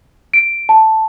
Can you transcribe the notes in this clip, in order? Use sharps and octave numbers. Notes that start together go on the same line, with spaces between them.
D7
A5